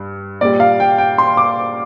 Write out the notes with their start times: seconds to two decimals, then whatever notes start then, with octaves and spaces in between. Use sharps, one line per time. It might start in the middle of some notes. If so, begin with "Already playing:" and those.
Already playing: G2
0.41 A#2 G3 D5
0.60 F5
0.80 G5
0.98 G5
1.18 C6
1.37 D6